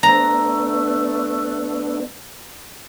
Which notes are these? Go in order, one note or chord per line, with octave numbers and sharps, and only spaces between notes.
A3 B3 D4 A#5